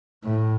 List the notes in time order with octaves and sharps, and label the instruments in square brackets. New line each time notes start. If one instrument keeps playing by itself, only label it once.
[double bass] A2